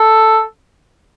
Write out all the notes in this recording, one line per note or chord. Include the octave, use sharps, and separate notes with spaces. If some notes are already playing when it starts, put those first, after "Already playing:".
Already playing: A4